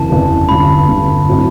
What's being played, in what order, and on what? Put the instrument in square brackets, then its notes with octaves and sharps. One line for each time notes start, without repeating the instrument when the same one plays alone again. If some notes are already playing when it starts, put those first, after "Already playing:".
Already playing: [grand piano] F#1 E2 C3 E3 [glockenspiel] A5
[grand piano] F#1 E2 C3 E3
[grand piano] G1 G2 D3 [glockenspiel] B5
[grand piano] G1 G2 D3
A2 F#3 C4 E4